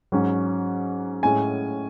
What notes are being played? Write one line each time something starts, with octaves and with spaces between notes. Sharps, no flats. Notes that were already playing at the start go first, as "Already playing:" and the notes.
G#2 F#3 C#4
A2 G#3 C#4 G#5